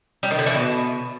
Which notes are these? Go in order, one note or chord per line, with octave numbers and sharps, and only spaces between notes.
G3
D#3
D3
E3
B2